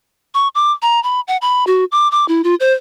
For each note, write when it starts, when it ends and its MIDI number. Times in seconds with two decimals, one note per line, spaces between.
0.35 0.48 85
0.55 0.72 86
0.82 1.02 82
1.03 1.20 83
1.28 1.37 78
1.42 1.64 83
1.67 1.85 66
1.92 2.10 86
2.11 2.27 86
2.28 2.42 64
2.44 2.55 65
2.60 2.73 72